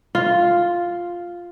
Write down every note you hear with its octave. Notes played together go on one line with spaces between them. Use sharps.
F4